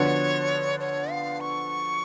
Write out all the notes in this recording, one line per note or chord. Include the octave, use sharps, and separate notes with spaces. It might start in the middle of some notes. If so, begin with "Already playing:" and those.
Already playing: D3 F3 B3 F#4 C#5
C#5
F5
C#6